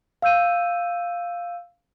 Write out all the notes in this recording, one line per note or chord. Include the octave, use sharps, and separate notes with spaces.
F5 E6 G6 D#7